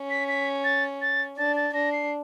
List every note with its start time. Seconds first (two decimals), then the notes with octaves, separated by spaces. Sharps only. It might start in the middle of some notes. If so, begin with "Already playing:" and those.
Already playing: C#4
0.10 B6
0.28 B6
0.64 A6
1.02 A6
1.38 D4 A6
1.56 A6
1.74 D4 A#6
1.92 C7